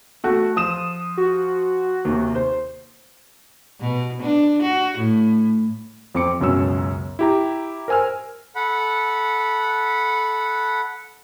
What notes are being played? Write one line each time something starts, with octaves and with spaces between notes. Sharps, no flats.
A3 F#4
F3 D#6 E7
F#4
D#2 C3
C5
B2
D4
F#4
A2
F2 C4 D6 C#7
C#2 F#2 B2 C#4 E6
E4 G4 A#5
A#4 C5 G#5 E6 F6
A4 F#5 B5